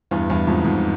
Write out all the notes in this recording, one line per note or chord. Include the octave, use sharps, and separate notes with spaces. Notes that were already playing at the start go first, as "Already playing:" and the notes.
E2 G2
E2 G2
F2 G#2
F2 G#2